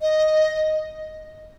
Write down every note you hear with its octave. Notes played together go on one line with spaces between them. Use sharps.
D#5